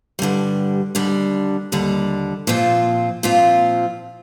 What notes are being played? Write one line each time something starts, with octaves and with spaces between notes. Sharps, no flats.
G2 D3 G3
D#2 D3 G3 D4
D#2 D3 G3 D4
A#2 F3 C4 F4
A#2 F3 C4 F4